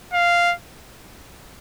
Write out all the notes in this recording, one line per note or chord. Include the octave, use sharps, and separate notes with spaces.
F5